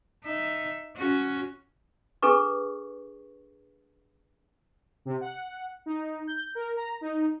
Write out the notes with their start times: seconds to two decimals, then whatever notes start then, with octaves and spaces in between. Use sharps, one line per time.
0.24 D#4 E5
0.96 C#4 F#4
2.22 D4 G#4 A4 B4 C#6
5.05 C3
5.21 F#5
5.86 D#4
6.27 G6
6.55 A#4
6.77 A#5
7.01 D#4